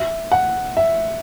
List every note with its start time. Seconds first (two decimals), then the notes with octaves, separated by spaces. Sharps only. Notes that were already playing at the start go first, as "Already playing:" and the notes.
Already playing: E5
0.32 F#5
0.77 E5